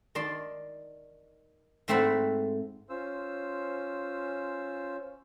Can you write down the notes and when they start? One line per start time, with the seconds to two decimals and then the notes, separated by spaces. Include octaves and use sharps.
0.15 D#3 D5 A5 C6
1.88 G#2 A3 C4 E5 F#5 B5
2.89 C#4 F4 C5 E6